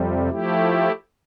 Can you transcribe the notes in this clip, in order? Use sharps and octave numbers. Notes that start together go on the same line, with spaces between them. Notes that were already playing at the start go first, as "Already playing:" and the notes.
Already playing: F2 C3 G3
F3 A3 E4 G4